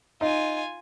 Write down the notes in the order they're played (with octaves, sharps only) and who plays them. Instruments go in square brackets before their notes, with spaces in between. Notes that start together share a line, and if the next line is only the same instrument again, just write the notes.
[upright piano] D#4 [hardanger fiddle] F4 G#5